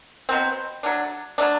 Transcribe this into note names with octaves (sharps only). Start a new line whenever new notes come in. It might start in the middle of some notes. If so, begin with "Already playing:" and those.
B2 F#3 C4
F#3 A3 D4
F#3 A3 D4